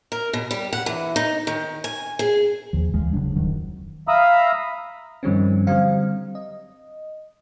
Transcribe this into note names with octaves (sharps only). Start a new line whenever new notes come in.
A#4
B2
G3
F#5
E3
D#4
D#3
G#5
G#4
D#2 F3
D2 E3 F3 G#3
F1 C#3 F#3 D4
D1 F2 D#3 F#3
E5 F5 A#5 B5 D#6 E6
G2 D#3 F3 G3 C4 C#4
D3 F#3 G3 C4 F5
D#5